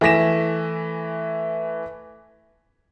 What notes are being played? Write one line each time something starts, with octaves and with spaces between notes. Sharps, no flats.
E3 A3 G#5 A#6 B6 E7